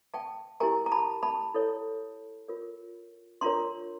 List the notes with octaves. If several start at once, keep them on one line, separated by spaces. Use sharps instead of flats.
G5 A5
E4 G4 A#4 G#5 A#5
A#5
A5 B5
A5 B5
E4 A4 C#5
F4 A#4 C#5
D4 F4 A#4 C#5 A#5 C6